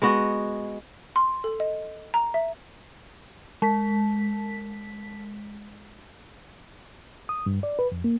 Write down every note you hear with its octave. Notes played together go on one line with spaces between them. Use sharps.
G#3 B3 F#4
C6
A4
D#5
A#5
E5
G#3 B6
D#6
G2
D5
B4
F2
A#3